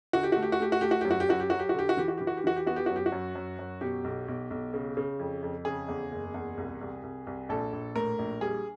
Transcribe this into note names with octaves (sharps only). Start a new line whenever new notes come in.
D3 F#4
G4
A3 F#4
G4
F#4
A3 G4
F#4
A3 G4
F#4
F#2 G4
F#4
G4
F#2 F#4
G4
F#3 F#4
G4
F#4
D3 G4
F#4
E3 G4
F#4
E3 G4
F#4
G4
E3 F#4
G4
B3 F#4
G4
F#2 F#4
G4
F#4
F#2
F#2
F#2
B2 G4
B1
B1
B1
C#3
C#3
F2
F2
C#3 G#4
E2
F#1
E2
C2
C2
C2
C2
A#1 A4
A#1
A2 A#4
A#1
G3 G#4